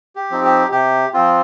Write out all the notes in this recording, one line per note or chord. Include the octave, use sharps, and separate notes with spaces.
G4
F3 C4 D#4
G4
C3 G4
F3 C4 F4